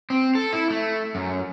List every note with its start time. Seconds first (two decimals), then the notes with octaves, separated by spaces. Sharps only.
0.10 C4
0.35 A4
0.53 E4
0.70 A3
1.15 F#2